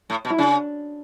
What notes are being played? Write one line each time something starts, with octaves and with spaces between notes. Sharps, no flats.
A2
B2
E4
C#3 D4